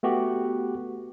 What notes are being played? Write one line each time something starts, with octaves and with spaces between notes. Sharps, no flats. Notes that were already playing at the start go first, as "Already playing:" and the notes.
A3 B3 F#4 G4